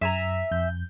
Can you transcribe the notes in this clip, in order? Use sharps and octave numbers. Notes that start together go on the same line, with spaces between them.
F#2 E5 G#5 A#5
F2 G6